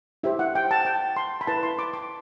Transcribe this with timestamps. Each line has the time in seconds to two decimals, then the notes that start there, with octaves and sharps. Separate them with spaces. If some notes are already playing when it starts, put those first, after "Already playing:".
0.23 E4 G4 C5 E5
0.39 F#5
0.55 G5
0.71 A5
0.85 G5
1.16 C6
1.41 B5
1.47 E4 B4 A5
1.63 C6
1.79 D6
1.93 D6